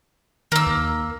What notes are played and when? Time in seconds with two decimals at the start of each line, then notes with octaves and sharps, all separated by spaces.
0.52 D#3 A#3 E6
0.67 D#2